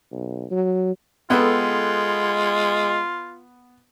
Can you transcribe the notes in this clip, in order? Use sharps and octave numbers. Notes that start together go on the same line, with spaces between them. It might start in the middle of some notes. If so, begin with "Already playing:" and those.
B1
F#3
G#3 B3 F4 A4 F#5 G5